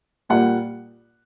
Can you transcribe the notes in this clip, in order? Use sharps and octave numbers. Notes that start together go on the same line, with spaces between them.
A#2 G3 A#3 F#5